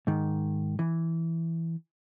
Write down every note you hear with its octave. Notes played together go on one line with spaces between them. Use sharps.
G#2 D#3
E3